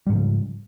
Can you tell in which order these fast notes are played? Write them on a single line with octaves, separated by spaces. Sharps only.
G3 G#2 F3 C#3